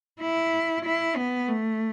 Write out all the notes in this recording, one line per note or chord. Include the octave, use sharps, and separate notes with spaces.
E4
E4
B3
A3